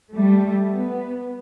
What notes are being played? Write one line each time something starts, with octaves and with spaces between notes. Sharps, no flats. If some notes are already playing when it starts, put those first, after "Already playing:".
G3 A3
B3